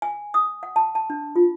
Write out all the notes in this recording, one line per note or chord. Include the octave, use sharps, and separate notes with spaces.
G#5
D#6
F#5
A5
A5
D4
F4